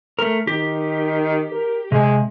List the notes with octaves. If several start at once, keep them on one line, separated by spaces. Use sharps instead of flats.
A3 A#4
D#3 G4
A#4
C3 G#3